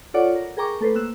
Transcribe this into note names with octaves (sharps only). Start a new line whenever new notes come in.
F4 A4 C#5 D5 F#5 D6
A#4
G#4 A#4 G5 A#5 C#6 D6
A3 A4 B4 C5
A#3 E6 F#6 E7